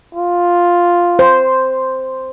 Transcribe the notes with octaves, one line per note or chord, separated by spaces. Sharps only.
F4
C5